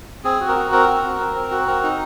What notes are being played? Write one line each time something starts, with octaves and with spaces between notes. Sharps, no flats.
C4 G#4
F#4
A#4
F#4
C4 A#4
F#4
C4
C4
C4
F#4
C4 A#4
D#4